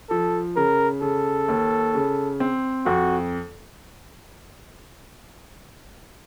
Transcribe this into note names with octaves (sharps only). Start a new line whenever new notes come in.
F3 A4
C#3 A#4
C#3 A4
D#2
C#3
C4
F2 F#4